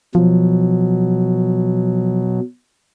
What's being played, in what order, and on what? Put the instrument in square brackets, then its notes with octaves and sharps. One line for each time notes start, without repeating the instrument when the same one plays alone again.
[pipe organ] B2 F#3 [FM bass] F3